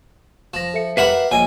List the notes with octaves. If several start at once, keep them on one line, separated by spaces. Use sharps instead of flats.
F3 A#6 E7
A4 E5 C#7
G4 A#4 B4 E5 F#5 B5 C7
A#1 C#5 D#5 G5 G#5